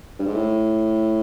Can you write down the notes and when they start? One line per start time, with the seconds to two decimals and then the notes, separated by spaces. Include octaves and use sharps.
0.19 G2
0.26 G#2
0.35 A2